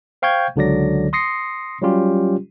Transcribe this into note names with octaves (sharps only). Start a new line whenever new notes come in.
C5 F5 G5 C#6 G6 G#6
C#2 D3 F#3 D5 A#6
C6 D#6 A#6 C7 C#7
F#3 G3 C#4 F4 G4